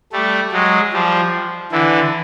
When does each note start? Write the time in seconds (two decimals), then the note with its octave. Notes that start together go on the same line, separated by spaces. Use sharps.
0.13 G3 A3
0.52 F#3 G#3
0.93 F3 G3
1.72 D3 E3